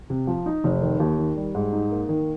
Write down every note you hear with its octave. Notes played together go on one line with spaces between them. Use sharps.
C3
F3
D#4
F1
D#3
D#2
D#3
G3
G#2
D#4
A#3
D#3